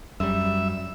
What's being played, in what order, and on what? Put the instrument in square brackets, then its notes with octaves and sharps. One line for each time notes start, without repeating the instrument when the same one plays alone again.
[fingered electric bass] F#2 G3 [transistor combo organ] E5